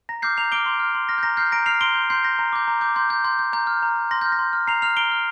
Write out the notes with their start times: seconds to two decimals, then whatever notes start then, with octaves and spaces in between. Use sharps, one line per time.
0.09 A#5 A#6
0.22 D6 F6 G6 C7
0.37 A#5 C7 F7
0.52 D6 F6 D7 G7
0.66 C6
0.80 F6
0.95 C6
1.09 F6 A#6
1.18 G6
1.23 A#5 A#6
1.37 F6 G6 C7
1.52 A#5 A#6 D7
1.66 F6 C7 F7
1.81 C6 D7 G7
1.95 G6
2.10 C6 G6 C7
2.24 G6 A#6
2.39 A#5
2.53 D6 G6
2.68 A#5
2.81 D6 G6
2.96 C6 G6
3.10 G6
3.24 C6 G6
3.39 G6
3.53 A#5 G6
3.67 F6
3.82 A#5
3.96 F6
4.11 C6 A#6
4.21 F6 G6
4.32 A#6
4.39 C6
4.53 F6
4.67 A#5 C7 F7
4.82 F6 C7 F7
4.97 A#5 D7 G7
5.11 F6